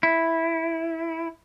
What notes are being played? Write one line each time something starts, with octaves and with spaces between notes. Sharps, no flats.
E4